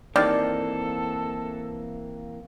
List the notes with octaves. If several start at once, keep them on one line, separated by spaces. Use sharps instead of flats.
D#3 E3 A#3 C4 A4 D5